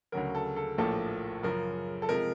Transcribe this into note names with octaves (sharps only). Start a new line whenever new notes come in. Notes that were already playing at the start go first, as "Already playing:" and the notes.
D2 C#3 F#3 A#4
A4
A4
A#1 A2 F3 A#3 A4
F#2 C#3 F3 A#4
A4
C3 F3 G#3 A#4